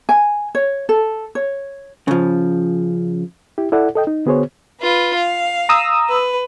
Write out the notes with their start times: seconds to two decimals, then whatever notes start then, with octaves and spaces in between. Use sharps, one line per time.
0.09 G#5
0.55 C#5
0.89 A4
1.35 C#5
2.08 C#3 F3
3.58 E4 G4
3.72 E4 A4 D5 F#5
3.95 A4 D#5 G5
4.07 D#4
4.26 D3 B3 F#4 G#4 C5 C#5
4.80 F4 B4
5.15 F5
5.69 A#5 D#6 E6
6.08 B4